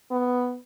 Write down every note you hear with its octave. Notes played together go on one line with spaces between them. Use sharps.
B3